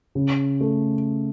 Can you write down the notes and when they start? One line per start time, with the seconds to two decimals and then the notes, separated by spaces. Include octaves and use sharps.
0.15 C#3
0.61 A3